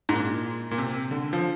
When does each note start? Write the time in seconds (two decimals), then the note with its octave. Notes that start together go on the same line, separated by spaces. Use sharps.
0.09 G#2
0.13 A#2
0.71 A#2
0.78 C3
1.11 D3
1.33 F3